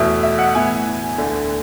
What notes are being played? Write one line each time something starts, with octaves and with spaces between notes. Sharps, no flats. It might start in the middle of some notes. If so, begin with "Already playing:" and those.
Already playing: E2 B2 A3 E5
E5
F#5
A2 E3 B3 E4 G#5
D2 D3 A3